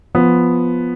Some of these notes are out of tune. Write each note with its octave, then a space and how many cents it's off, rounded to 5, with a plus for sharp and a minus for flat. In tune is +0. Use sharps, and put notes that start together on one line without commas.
F3 +0 B3 +0